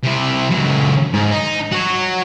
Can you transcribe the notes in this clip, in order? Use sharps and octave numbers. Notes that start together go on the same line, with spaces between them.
C3 E4
C#2 F#3
G#2
D#4
F#4 C#5